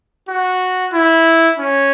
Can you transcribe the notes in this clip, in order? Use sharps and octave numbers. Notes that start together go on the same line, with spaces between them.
F#4
E4
C#4